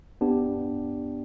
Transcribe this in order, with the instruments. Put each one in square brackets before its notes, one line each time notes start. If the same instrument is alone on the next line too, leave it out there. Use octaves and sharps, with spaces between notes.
[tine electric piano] B3 D4 G4